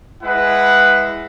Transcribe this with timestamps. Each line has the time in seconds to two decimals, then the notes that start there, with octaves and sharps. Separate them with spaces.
0.22 G#3 E4 B4 F#5